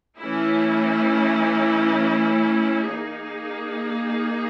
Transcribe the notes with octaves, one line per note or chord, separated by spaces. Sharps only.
E3 A3 C#4 E4
A#3 D#4 G#4